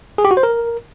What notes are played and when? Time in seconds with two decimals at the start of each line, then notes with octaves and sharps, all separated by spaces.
0.18 G#4
0.25 G4
0.31 F#4
0.37 C5
0.43 A#4